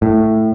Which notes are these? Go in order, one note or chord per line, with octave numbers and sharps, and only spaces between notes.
A2